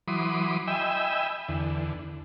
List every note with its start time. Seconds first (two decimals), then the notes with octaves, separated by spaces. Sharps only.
0.08 E3 F#3 B5 C6 D6 D#6
0.67 D#5 E5 G5 G#5 B5 E6
1.48 E2 D3